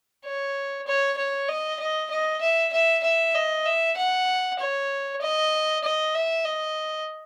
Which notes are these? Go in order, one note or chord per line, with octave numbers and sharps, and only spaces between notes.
C#5
C#5
C#5
D#5
D#5
D#5
E5
E5
E5
D#5
E5
F#5
C#5
D#5
D#5
E5
D#5